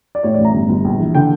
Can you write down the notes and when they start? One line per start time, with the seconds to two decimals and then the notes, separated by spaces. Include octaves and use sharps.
0.15 D5
0.23 A2 C#5
0.34 A1 D5
0.45 A#5
0.54 G1
0.69 G1
0.84 A#1
0.99 E3
1.15 D3 G5